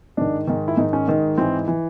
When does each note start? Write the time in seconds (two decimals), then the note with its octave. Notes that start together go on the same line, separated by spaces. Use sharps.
0.17 G#2 D#3 D4
0.47 G#2 D#3
0.68 E4
0.77 G#2 D#3 D#4
0.93 C#4
1.08 G#2 D#3
1.38 G#2 E3 C4
1.68 E3